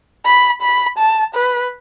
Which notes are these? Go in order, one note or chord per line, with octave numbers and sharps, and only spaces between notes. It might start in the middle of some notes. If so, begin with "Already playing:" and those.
B5
B5
A5
B4